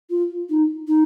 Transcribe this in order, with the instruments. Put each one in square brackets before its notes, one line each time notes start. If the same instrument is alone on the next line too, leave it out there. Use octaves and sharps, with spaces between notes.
[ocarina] F4
D#4
D#4